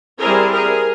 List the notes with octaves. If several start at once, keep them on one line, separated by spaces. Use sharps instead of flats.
G3 C4 E4 G#4 A#4
G#4 A#4